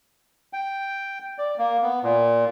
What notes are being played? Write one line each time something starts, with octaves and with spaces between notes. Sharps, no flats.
G5
D5
A#3
B3
A#2